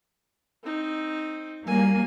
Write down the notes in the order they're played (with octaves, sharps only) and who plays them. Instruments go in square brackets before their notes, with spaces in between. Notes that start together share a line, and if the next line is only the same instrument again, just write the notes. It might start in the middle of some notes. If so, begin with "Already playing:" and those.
[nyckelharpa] C4 D#4
[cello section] F#3 G3 A#3 [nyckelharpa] G#5